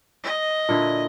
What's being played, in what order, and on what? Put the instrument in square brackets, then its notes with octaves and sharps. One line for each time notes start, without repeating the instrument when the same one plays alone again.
[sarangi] D#5
[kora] A#2 D3 E4